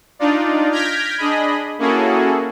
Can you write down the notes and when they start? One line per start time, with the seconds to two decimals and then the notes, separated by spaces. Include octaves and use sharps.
0.19 D4 D#4 F4 D5
0.71 F6 G6 G#6 A#6 B6 D7
1.18 D4 G#4 D#5 B5
1.79 A#3 C#4 E4 F#4 G#4 A4